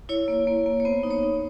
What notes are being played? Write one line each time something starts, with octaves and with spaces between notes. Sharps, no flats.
E4 C#5
A#3
A#3
A#3
C#5
B3 C5
D#4
C#5
D#4